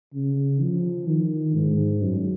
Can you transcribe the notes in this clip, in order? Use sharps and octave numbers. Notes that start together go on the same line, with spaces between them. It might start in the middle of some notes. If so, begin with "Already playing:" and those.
C#3
F3
D#3
G#2
F#2